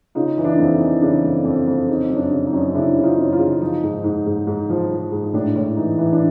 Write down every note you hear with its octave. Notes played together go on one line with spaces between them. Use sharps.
C#3 D#4 F4
E3
D4 E4
F2
D#4
E3
C#3 D4
F2
F2
F2
C#3 D#4
F#2
D4
C#3
D#4
F#2
C#3 D4 E4
C#3
D#4 F4
F#2
D#4 F4
C#3
F3 D#4
G#2
G#2
G#2
G#2
F3
F3
G#2
A2 D4
A2
E3 D#4
E3
D4